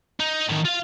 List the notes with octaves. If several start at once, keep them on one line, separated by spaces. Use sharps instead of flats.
D#4
A2 D#3
F4 F5